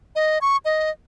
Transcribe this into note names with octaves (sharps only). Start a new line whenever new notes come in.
D#5
C#6
D#5